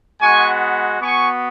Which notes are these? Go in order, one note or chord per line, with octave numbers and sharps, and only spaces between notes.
G#3 B3 F#4 G#5 C#6
B3 F#4 G#5 C#6